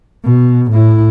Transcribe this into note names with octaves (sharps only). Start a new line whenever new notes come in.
B2
A2 E4